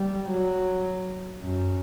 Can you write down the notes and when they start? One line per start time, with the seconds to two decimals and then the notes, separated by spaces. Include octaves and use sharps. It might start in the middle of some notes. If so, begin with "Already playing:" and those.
Already playing: G3
0.30 F#3
1.41 F#2